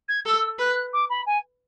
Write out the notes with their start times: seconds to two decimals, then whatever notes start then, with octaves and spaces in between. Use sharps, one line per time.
0.09 G#6
0.26 A4 E6
0.58 B4 F#6
0.93 D6
1.09 B5
1.26 G#5